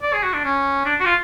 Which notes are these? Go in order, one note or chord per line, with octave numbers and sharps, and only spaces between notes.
D5
G#4
F#4
D4
C#4
D4
F#4
F4